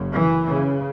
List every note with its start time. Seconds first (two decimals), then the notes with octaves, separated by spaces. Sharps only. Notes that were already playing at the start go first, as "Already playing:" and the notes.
Already playing: F#1 F#2 C#3
0.12 E3
0.48 C#3